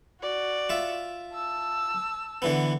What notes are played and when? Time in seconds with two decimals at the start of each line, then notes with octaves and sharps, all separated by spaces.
0.21 F#4 D5
0.69 F4 E5
1.34 A5 E6
2.42 D3 E3 B3